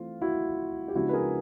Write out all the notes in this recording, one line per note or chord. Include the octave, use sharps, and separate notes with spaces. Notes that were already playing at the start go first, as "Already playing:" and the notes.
Already playing: E3 A3 C4 F4
E4 F#4
G4
C#3 F3 G#3 B3 D4 E4 F#4
B4
G#4 A#4